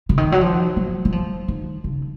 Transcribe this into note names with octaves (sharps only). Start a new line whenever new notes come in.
C#3
D#3
F#3
F3
F#3
F#3
F3
D#3
C#3